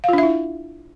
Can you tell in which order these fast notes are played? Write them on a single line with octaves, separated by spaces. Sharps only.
F5 F4 D4 E5 E4